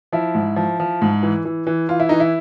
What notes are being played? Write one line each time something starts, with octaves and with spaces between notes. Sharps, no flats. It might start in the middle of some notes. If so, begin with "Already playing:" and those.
F3 E4
G#2
F3
F3
G#2
E3
E3
E3
E3 F4
E4
E3 D#4
E4